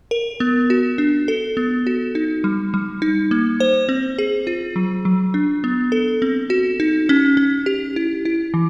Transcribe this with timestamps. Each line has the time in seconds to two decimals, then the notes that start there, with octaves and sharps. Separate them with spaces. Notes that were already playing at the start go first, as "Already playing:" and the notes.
0.11 A#4
0.40 B3
0.70 F#4
0.98 D4
1.28 A4
1.57 B3
1.87 F#4
2.15 D#4
2.44 G3
2.74 G3
3.02 D#4
3.31 A#3
3.60 C5
3.89 C4
4.18 G#4
4.47 F4
4.76 F#3
5.05 F#3
5.34 D4
5.64 B3
5.92 A4
6.22 C4
6.50 F#4
6.80 D#4
7.09 C#4
7.37 C#4
7.66 G4
7.96 E4
8.25 E4
8.54 E3